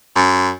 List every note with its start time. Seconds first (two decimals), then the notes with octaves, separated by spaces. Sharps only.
0.16 F#2